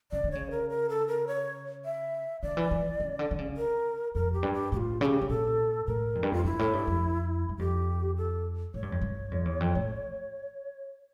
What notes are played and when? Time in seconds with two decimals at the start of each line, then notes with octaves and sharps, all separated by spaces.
0.12 C#3 D5
0.24 D3
0.31 C#3 C#5
0.51 A#4
0.70 A#4
0.89 A4
1.08 A#4
1.27 C#5
1.85 E5
2.42 D3 D5
2.57 E3
2.71 E3
3.00 C#3
3.19 D3
3.31 D3
3.39 C#3
3.57 A#4
4.15 F2 A#4
4.33 G4
4.43 G2
4.53 G4
4.72 A2 G4
4.77 F4
5.01 C#3 G4 A4
5.21 C#3
5.29 A#2 A4
5.87 A2 A#4
6.15 F2
6.23 G2
6.32 F2 F4
6.44 G2 E4
6.59 A2
6.73 G2
6.87 F2
7.49 G2
7.59 F2 G4
8.17 A4
8.74 A2 C#5
8.83 G2
8.92 F2
9.01 G2
9.31 F2
9.45 E2
9.60 F2
9.75 A2